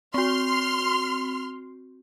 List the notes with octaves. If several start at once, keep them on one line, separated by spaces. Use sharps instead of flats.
C4 F#4 C6 F6